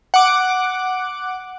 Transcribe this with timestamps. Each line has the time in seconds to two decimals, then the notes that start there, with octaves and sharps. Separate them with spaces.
0.14 F#5 D6